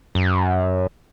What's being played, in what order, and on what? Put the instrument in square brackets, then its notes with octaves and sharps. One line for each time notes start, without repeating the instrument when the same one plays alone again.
[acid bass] F#2